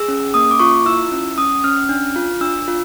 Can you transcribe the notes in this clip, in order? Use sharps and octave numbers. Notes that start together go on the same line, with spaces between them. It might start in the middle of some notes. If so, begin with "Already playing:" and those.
Already playing: G#4 E6
C#4
A#3 D#6
D6
F4 C#6
E4 E6
C#4
C#4 D#6
C#4 F6
D4
F4
D4 E6
F4